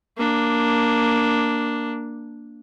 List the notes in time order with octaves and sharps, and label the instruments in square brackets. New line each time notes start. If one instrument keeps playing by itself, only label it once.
[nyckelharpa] A#3 D4